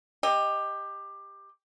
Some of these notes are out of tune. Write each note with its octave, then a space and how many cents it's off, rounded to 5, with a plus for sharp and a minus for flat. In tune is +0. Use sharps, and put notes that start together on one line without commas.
G4 +15 D#5 +0